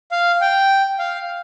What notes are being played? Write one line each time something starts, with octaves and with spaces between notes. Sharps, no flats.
F5
G5
F5